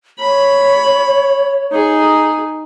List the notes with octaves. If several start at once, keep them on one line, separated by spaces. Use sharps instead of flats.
C#5 B5
D#4 G#4